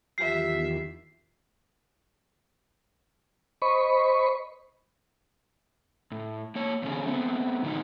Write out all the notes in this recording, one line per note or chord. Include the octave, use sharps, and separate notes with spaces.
E2 D#3 F#3 F4 G4 E5 C7
C5 D#5 B5 C#6
A2
A#3 C#5
E2 B2 D3 F#3 C#4 G#4
A3 B3 C4
A2 D3 D#3 A3 D#4 F#4